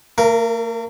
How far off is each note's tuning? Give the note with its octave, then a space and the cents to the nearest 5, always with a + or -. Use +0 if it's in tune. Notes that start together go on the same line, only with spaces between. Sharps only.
A#3 -45 A#4 +0